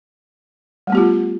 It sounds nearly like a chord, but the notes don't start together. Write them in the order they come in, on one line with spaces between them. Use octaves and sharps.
G3 A3 B3 G4 F4